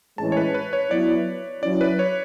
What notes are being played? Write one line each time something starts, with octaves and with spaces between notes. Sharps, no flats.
A2 E3 G#3 C#4 A5
C#5
B4
B4
C#5
F#3 B3 E4 D5
F#3 C#4 E4 D5
B4
C#5